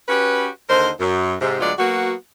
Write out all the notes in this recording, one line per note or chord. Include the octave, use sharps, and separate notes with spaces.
C#4 F#4 G4 B4
D#2 D3 D#4 A#4 C5
F#2
G#2 C3
D2 F#3 G#3 B3 F4 D5
F#3 A#3 B3 F#4